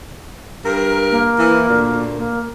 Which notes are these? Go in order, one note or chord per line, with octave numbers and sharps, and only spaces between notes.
G2 A#4
A#3
E3
D2 A#2
A#3